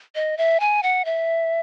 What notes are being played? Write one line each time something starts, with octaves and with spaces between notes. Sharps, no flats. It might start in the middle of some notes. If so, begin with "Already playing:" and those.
D#5
E5
G#5
F#5
E5